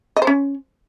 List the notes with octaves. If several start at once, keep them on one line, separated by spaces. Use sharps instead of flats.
D#5
C5
C#4